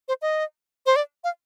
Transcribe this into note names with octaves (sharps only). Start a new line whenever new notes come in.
C5
D#5
C5
D5
F5